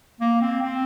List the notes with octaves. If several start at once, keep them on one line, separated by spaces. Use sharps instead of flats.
A#3
C4
C4